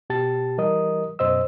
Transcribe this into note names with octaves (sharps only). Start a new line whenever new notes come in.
B2 G4 A5 A6
E3 G3 A#4 D#5 D#6
F#2 B2 C5 D#5 E6